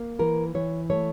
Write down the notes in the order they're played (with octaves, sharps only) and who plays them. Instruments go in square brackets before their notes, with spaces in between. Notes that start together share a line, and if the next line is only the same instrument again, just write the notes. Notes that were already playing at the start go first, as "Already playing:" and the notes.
Already playing: [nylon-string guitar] A#3
E3 A#4
E3 C#5
A3 C#5